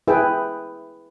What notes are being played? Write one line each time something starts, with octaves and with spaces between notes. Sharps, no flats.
E4 G#4 B4 E5 G5